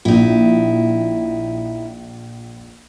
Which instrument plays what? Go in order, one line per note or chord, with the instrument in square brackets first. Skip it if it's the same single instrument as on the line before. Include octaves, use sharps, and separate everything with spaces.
[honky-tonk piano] A#1 [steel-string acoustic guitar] D#4 E4